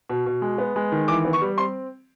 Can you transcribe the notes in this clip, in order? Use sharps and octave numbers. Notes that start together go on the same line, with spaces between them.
B2
B2
G#3
B3
G#3
D#3
E3 D6
B3
C#6
G3
C4 C6